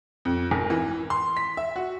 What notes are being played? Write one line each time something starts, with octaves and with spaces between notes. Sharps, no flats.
F2
G#1
E3
C6
B6
E5
F#4